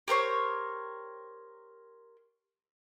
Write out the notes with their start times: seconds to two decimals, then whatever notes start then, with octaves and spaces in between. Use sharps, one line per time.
0.08 G4 A#4 C5 C#5